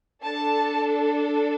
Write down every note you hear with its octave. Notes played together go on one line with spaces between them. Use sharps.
D4 A4 A5